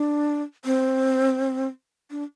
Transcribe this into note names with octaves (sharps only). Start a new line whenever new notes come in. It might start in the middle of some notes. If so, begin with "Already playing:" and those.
Already playing: D4
C4
D4